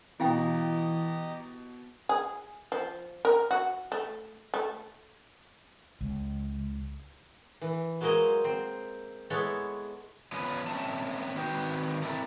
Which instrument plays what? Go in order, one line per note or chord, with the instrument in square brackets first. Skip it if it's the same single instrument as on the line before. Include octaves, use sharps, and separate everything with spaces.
[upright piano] B2 [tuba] E3 [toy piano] E4 F5 G5 [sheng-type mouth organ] G4 D#5 A#5
[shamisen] G#4
F3
A#4
F#4
A3
A3
[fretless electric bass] C#2
[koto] E3
F#3 G#3 A#3 A#4 C5 D#5
C4
G#3 B3 E4 A4 C#5
[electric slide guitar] F3 B3 C#4 F4 B4
A#3 C4 C#4 E5 A5
D#3 C4 F#4 B4 G5
A3 A#3 C4 E4 A4